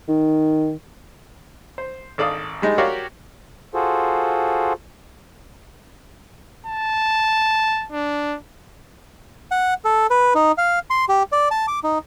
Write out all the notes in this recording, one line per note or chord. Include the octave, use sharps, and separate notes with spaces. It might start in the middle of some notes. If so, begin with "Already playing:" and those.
D#3
C5
G#1 A4 D5 F5 D#6
G3 G#3 D#4
F#4 G4 A#4 C#5 D5 F5
F4 F#4 G#4 A4 C5
A5
D4
F#5
A4
B4
D#4
F5
C6
G4
D5
A5
D6
D#4